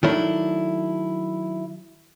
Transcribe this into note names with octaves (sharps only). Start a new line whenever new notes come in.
D#3 F#3 A3 D4 E4